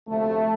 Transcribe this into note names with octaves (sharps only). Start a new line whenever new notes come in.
D2 C3 F3 A3